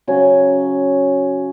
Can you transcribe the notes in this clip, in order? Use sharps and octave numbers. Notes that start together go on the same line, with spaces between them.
C#3 F#3 C#4